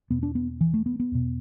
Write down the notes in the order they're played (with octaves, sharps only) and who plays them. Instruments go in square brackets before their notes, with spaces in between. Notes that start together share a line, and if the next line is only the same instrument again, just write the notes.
[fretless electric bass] E2 B2 B3
D4
B3
E3
A3
B3
B3
E2 B2